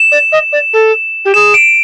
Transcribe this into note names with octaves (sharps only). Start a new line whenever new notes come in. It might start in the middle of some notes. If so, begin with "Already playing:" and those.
Already playing: E7
D5
D#5
D5
A4
G4
G#4 E7
D7